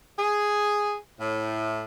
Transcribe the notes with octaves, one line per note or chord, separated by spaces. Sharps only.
G#4
A2